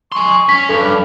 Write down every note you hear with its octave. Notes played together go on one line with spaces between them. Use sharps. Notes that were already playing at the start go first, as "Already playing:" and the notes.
G#5 C6 C#6
C#4 B6
G2 D4 A4